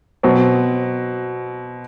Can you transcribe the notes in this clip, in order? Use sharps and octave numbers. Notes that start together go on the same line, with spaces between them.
B2 F#3 C4